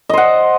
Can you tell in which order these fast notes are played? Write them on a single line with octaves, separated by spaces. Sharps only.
D#5 C5 F#5